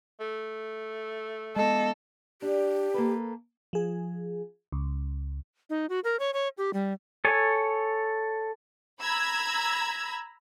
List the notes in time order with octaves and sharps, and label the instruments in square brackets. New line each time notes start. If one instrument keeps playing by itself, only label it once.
[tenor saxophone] A3
[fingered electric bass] G#3 B3 [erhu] A4 [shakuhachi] D#5
[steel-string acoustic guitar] D4 [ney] G4
[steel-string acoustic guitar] A#3 A4 B4
[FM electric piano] F3 G#4
C#2
[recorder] D#4
F#4
A#4
C#5
C#5
G4
G3
[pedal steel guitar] A4 C#5 G#5
[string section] A#5 B5 E6 G#6